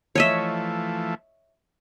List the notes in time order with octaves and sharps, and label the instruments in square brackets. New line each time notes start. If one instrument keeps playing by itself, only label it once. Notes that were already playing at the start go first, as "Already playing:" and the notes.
[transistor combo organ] E3 F3 A3 [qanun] C#5 D#5 E5